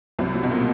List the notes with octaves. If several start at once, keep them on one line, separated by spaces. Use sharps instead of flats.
C2 C3 F#3
F#3
B2
A#2 A#3